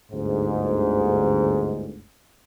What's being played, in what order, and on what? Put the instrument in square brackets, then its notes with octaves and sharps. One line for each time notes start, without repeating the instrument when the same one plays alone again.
[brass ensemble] G1 D2 G#2